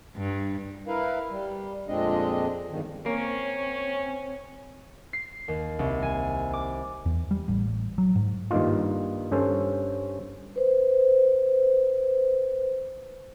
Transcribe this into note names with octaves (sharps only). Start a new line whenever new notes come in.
G2
E4 A#4 B4 F5
G3
F2 A#2 G#3 C4 D4 D#5
E2 G2 D#3
A#3 C4 C#4 C#5
C7
D#2
C2
G#5
D6
E2
G3
A1
F#3
G#2
G2 D#3 A#3 D#4 F4
G2 C#4 A4 C5
B4 C5